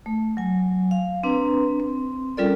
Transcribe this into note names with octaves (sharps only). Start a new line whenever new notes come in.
A3
F#3 G#5
F5
C4 D4 B4 A#5
C4
G3 C#4 F4 A4 A#4 D5